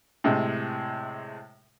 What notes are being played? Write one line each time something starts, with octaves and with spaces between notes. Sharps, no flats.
A2 C3 G#3